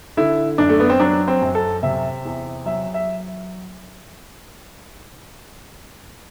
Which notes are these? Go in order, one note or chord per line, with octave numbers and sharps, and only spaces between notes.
D3 E4
F#2 D4
A3
B3
C4
F#3 D4
C4
F#2
A4
C3 E5
E2
F#3 E5
E5